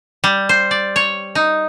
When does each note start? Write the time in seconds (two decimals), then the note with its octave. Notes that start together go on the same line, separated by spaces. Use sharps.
0.24 G3
0.49 C5
0.71 D5
0.96 C#5
1.35 D#4